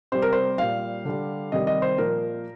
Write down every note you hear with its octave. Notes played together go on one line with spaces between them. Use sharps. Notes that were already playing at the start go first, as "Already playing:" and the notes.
C3 G3 C5
A#4
C5
A#2 G3 F5
D3 G3
C3 D#3 G3 D#5
D#5
C5
A#2 F3 A#4